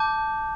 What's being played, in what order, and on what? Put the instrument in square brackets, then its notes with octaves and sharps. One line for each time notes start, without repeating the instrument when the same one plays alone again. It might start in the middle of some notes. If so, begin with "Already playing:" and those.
Already playing: [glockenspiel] A5 D6 G6